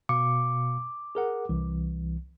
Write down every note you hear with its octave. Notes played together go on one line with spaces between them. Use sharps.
B2 F5 D6 C#7
G#4 A#4 F#5
C2 E3